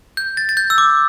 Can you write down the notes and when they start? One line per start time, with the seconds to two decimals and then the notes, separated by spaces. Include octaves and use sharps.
0.17 G6
0.37 A6
0.49 A6
0.57 G6
0.70 E6
0.78 D6